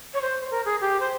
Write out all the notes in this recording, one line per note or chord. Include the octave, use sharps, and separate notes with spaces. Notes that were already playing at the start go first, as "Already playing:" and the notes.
C#5
C5
A#4
G#4
G4
C5